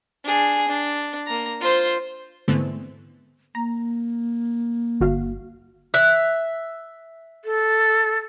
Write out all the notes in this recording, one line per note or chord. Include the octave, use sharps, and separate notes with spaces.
D4 G#4
D4
A#3 A#5
F4 C5
G#2 D3 E3 A3 B3 C4
A#3 A#5
G1 F#4 F5
E5 F#6
A4